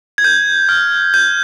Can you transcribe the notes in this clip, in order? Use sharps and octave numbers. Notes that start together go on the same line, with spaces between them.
G#6
G6
F6
G6